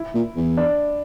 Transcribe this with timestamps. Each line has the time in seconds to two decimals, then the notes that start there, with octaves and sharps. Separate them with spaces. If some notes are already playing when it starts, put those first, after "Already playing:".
Already playing: E4
0.15 A#2
0.36 E2
0.57 D4